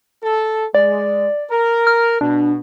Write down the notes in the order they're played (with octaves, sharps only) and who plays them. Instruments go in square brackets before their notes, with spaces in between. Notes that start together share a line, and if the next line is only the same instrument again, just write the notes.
[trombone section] A4
[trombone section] G#3 [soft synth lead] D5
[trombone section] A#4
[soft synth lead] F6
[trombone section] B2 [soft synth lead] D4